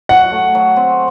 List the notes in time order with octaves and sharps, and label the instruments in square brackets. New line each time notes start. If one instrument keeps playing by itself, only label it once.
[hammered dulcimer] F#3 [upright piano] F#5
[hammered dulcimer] A3
F#3
C4